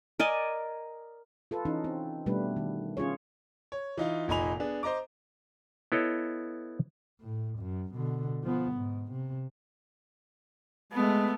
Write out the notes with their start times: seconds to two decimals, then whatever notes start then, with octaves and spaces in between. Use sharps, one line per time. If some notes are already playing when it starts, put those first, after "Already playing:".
0.20 A#4 D5 D#5 G#5
1.51 F4 A4 B4
1.65 E3 C#4 D#4
1.84 C4
2.26 B2 G3 A3 B3 D4 B4
2.56 D#3
2.97 C#4 F4 G#4 C#5
3.72 C#5
3.97 E3 D#4 F4
4.28 F1 A#2 D#4 G#5 B5 F7
4.60 B3 D4 G#4
4.83 C5 D#5 A#5 D6
5.92 B3 E4 A4 C#5 D#5
7.21 A2
7.59 F#2
7.95 B2 D3
8.43 F3 B3
8.73 G#2
9.11 C3
10.92 G#3 A3 B3